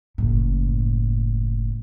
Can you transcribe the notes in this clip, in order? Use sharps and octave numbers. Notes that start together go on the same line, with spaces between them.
F#1 A2